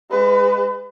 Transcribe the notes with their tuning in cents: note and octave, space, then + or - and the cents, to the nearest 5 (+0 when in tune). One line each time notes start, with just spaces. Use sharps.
G#3 -25 B4 +30